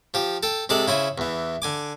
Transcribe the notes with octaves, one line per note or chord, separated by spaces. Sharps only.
F3 G4
A4 G5
C3 G#3 A4 D5
C#3 E4 C5 G#5
E2 E3
D3 G#5 D6